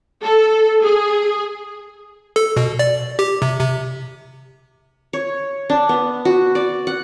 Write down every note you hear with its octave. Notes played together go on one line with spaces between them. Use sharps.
A4
G#4
A4
B2
D5
G4
C3
C3
C#5
D4
B3
F#4
D5
F#5